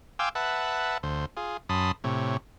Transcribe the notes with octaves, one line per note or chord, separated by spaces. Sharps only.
F5 G5 G#5 C6 D6 E6
B4 E5 F#5 A5
D2 C5
F4 G#4
F#2 A5 B5 C6 D#6
A2 C3 C#5